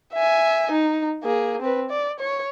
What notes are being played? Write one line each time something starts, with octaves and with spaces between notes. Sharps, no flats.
E5 G#5
D#4
A#3 G#4
C4 B4
D5
C#5